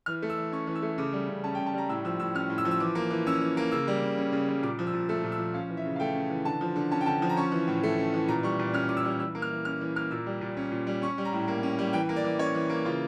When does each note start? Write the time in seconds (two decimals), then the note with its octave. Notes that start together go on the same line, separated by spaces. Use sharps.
0.06 E3 F6
0.22 A3
0.30 E6
0.38 E3
0.52 C#4 C#6
0.67 E3
0.75 E6
0.82 A3
0.98 C#3 D6
1.13 G3
1.29 C#3
1.44 C#4 A5
1.55 G5
1.59 C#3
1.66 A5
1.74 G3 A#5
1.89 A2 E6
2.05 F3 E6
2.20 A2 E6
2.34 C#4 F6
2.50 A2
2.58 E6
2.65 F3
2.71 E6
2.80 E3 D6
2.95 A#3
3.11 E3
3.26 C#4 E6
3.41 E3
3.57 A#3
3.72 C#3 E6
3.88 G3
4.02 C#3
4.18 C#4
4.32 C#3
4.49 G3
4.63 A#2 D6
4.79 F3
4.87 E6
4.93 A#2
5.09 A3 E6
5.24 A#2
5.32 E6
5.39 F3
5.54 C#4 F5
5.69 E3
5.77 E5
5.86 C#3
5.96 F5
6.00 A3 G5
6.15 C#4
6.30 E3
6.45 D3 A5
6.61 F3
6.76 D3
6.91 C#4 A5
7.01 G5
7.06 D3 A5
7.22 F3
7.29 A#5
7.37 C#4 C#6
7.52 E3
7.68 A2
7.83 A3
7.98 C#4
8.14 E3
8.28 A#2 A#5
8.43 G3 C#6
8.59 A#2
8.73 C#4 F6
8.89 A#2 D6
8.97 E6
9.05 G3
9.20 E3 E6
9.35 A#3
9.42 F6
9.51 E3
9.65 C#4 F6
9.81 E3
9.96 A#3 F6
10.11 A#2 E6
10.26 G3
10.41 A#2
10.57 C#4
10.72 A#2
10.87 G3
11.02 C#4 C#6
11.18 G3
11.25 A#5
11.33 A2
11.48 A#3
11.63 C#4
11.79 G3
11.93 E3 G5
12.09 A#3
12.16 D5
12.24 E3
12.39 C#4 C#5
12.55 E3
12.70 A#3
12.85 C#3 F4